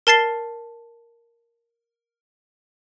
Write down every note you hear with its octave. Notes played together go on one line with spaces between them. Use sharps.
A#4 A5 A6 C7 G7